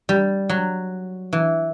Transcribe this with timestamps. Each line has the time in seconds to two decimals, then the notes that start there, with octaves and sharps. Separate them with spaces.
0.09 G3
0.49 F#3
1.33 E3